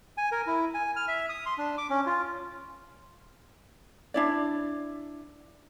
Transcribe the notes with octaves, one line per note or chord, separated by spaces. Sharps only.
G#5
A#4
E4
G#5
F6
E5
D#6
C6
D4
D6
C#4
F4
D4 E4 D5